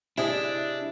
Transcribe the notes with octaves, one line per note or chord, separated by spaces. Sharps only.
C3 D4 E4 G#4 D#5